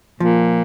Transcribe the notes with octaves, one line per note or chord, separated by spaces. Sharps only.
A#2 F3